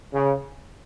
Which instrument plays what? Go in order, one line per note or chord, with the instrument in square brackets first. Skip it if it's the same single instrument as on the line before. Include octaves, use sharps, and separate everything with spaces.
[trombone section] C#3